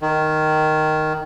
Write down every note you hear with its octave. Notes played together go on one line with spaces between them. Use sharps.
D#3